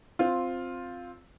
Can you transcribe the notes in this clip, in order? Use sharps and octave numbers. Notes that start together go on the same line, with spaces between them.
C4 F4